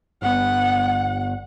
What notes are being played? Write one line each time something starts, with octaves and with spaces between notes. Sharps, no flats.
G1 B3 F#5